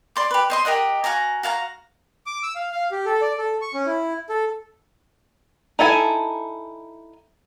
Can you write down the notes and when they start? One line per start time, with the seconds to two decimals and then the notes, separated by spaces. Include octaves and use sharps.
0.16 D5 C6 D6
0.31 G4 B4
0.50 C5 D#5 C6
0.65 G4 A#4 D#5 F#5
1.04 F#4 F5 G#5 A#5
1.43 F#4 F5 G#5 A#5
2.26 D6
2.43 E6
2.55 F5
2.72 F5
2.91 G4
3.06 A4
3.21 D5
3.38 A4
3.61 C#6
3.74 C#4
3.86 E4
4.29 A4
5.79 D#4 E4 A4 G#5